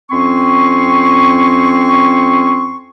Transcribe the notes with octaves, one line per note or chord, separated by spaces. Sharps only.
F2 C4 C#4 C6 C#6